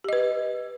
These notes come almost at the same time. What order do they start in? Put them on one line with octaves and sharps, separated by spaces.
G4 D#5 B4